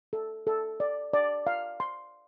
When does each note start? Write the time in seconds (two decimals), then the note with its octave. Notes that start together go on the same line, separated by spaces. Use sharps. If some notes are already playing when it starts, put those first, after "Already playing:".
0.13 A4
0.47 A4
0.80 D5
1.13 D5
1.47 F5
1.80 C6